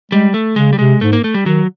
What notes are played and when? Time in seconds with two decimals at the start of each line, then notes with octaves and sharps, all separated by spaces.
0.12 G3 G#3
0.34 A3
0.56 C#3 G#3
0.73 G3
0.79 C3 G#3
1.01 G#2 A3
1.13 A#3
1.24 A3
1.34 G3
1.46 D#3 F#3